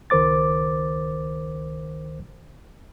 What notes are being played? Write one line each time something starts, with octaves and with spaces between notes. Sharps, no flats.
C#2 D#3 A#4 C5 D6 A6